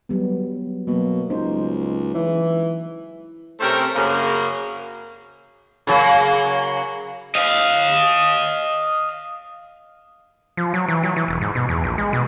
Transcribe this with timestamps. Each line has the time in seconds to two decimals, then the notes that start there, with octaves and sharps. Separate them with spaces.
0.09 F#3 G3 B3
0.87 B2 F#3 A#3
1.30 C#2 D#4 C5
2.15 E3
3.60 C3 A3 C4 C#4 A#4 C5
3.95 F#2 C#3 A#3
5.87 C#3 F#3 A#3
7.35 D#5 F5
10.57 F3
10.74 F#3
10.88 E3
11.03 F#3
11.16 E3
11.28 E1
11.41 G#2
11.55 B2
11.69 E2
11.84 A#1
11.98 G#3
12.13 B2